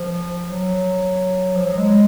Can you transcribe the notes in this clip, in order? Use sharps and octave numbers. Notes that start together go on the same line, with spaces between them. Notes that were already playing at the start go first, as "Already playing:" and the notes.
Already playing: F3
F#3
F3
F#3
G#3